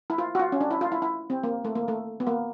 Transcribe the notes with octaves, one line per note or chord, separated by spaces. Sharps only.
E4
F4
F#4
F4
C#4
D4
E4
F4
E4
E4
C4
A#3
A3
A#3
A3
B3
A#3